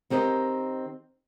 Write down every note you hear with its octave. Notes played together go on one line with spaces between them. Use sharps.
D#3 C4 G4 A#4 D#5